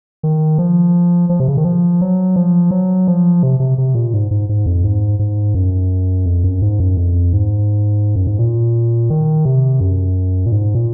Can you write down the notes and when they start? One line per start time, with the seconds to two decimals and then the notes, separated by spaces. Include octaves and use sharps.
0.23 D#3
0.58 F3
1.29 F3
1.40 C3
1.48 C#3
1.57 D#3
1.64 F3
2.01 F#3
2.36 F3
2.71 F#3
3.07 F3
3.43 C3
3.60 C3
3.78 C3
3.95 A#2
4.14 G#2
4.31 G#2
4.49 G#2
4.66 F2
4.84 G#2
5.19 G#2
5.54 F#2
6.26 F2
6.44 F#2
6.62 G#2
6.80 F#2
6.97 F2
7.33 G#2
8.15 F#2
8.27 G#2
8.38 A#2
9.10 D#3
9.45 C3
9.80 F#2
10.46 A#2
10.52 G#2
10.75 A#2